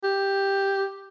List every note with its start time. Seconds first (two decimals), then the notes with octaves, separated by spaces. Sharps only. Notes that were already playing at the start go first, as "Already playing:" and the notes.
0.03 G4